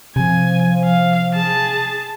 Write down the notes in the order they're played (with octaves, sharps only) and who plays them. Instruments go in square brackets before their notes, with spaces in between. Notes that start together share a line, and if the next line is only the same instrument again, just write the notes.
[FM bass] C3 [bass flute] F3 [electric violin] G#5
[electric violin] F5
G#4 A5